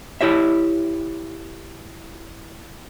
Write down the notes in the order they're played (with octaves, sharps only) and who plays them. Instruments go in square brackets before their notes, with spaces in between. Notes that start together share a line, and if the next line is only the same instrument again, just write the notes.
[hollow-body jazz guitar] E4 G4 C#5 E5